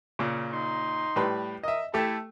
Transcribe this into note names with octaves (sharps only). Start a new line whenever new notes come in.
A#2 C#3
D#4 C6
A2 G3 B4
A#4 D#5 E5 D#6
A3 E4 G4 A4 A5